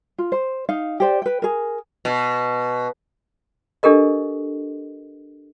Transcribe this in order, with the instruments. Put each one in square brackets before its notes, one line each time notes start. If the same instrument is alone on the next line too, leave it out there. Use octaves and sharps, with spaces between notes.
[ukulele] F4
C5
D#4 F5
G4 C5 D5
B4 G5
G#4 A#4
[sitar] B2
[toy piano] D4 G4 A4 A#4 D#5